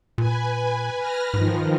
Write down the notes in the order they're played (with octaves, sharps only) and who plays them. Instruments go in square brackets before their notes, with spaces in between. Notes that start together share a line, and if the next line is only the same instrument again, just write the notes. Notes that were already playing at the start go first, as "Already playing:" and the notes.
[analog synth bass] A#2 [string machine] B4 G#5
[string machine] B4 F6 A#6
[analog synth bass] G#2 [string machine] D#3 F3